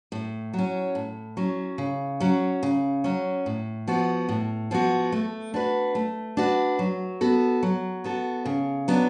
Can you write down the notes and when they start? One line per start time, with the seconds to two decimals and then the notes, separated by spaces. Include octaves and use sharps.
0.12 A2
0.54 F#3 C#4
0.95 A2
1.37 F#3 C#4
1.78 C#3
2.20 F#3 C#4
2.63 C#3
3.04 F#3 C#4
3.46 A2
3.87 F3 B3 F#4
4.29 A2
4.71 F3 B3 F#4
5.12 A3
5.54 D4 F#4 B4
5.95 A3
6.37 D4 F#4 B4
6.79 F#3
7.21 B3 F#4 A4
7.63 F#3
8.04 B3 F#4 A4
8.45 C#3
8.88 F#3 B3 D4